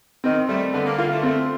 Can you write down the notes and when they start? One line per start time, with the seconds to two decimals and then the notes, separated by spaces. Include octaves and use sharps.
0.24 D#3 C4
0.48 G3 A3
0.74 D3 B3
0.86 A#3
0.98 A#3 F4
1.11 A3
1.23 A3 C4